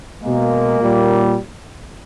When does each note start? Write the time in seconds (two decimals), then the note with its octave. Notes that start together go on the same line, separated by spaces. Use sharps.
0.24 B2 G#3 A#3
0.80 A#2 G3